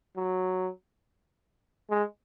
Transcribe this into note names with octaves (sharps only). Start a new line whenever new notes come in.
F#3
G#3